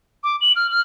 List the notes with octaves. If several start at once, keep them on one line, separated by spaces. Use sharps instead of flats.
D6
F#7
F6
F6